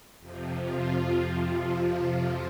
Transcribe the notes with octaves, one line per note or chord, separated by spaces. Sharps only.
F2 C3 F3
F4